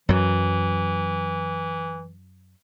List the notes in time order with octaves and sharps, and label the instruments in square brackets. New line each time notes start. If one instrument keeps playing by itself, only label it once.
[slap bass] F#2 F#3 [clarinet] E3